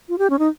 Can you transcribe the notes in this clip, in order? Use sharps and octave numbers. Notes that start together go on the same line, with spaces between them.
F4
G4
C#4
D#4